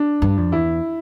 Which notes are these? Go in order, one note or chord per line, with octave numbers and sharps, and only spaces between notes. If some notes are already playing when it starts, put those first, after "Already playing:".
Already playing: D4
G2
F2
E2 E4